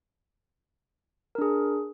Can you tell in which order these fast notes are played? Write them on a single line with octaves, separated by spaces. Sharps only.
A#4 D4 G#4